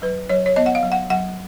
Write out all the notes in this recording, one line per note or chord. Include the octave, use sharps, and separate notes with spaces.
F#3 B4
F#3 C#5
C#5
B3 D#5
F#5
F5
F#3
F#5
F#3 F#5